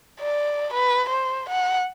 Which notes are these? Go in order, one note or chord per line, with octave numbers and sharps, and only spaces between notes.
D5
B4
C5
F#5